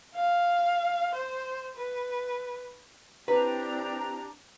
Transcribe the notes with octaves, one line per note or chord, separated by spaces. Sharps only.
F5
C5
B4
C4 D4 E4 G4 B4 A#5